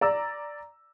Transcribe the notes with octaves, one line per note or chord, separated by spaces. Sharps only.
D5 A#5 E6